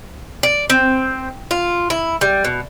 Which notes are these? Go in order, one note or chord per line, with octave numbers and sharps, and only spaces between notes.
D5
C4
F4
E4
G3
B2